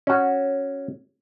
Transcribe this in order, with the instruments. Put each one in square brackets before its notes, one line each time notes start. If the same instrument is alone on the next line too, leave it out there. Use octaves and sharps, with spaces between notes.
[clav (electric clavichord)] C#4 F#4